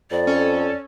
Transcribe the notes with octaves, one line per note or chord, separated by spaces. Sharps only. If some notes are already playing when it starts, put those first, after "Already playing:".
F2 D5
C#4 A4